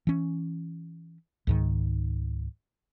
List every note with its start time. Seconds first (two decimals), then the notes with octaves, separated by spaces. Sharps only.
0.07 E3 C#4
1.47 C#2 G#2 D#3